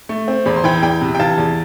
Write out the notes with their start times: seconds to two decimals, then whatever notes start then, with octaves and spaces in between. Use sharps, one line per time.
0.09 A3
0.28 C4
0.46 E2 B5
0.56 C6
0.64 E3 G5 B5
0.82 E2 G5 B5
1.01 C3
1.15 G5
1.19 E3 F5 A5
1.38 E2